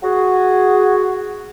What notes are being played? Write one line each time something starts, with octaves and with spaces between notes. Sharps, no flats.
F#4 G#4